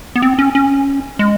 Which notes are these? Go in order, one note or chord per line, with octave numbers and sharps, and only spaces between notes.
B3
C4
C#4
C#4
G#3